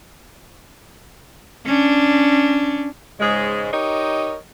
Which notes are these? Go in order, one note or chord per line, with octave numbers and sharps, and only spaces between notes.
C#4 D4
G#2 C#3 G#3
D#4 G4 A#4 C#5 D#5